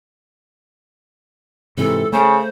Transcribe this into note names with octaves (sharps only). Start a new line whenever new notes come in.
G#2 C3 E3 A4
C#3 A3 C5